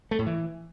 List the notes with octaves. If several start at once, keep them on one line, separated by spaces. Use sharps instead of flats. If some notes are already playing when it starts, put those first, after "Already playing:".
A3
A2
E3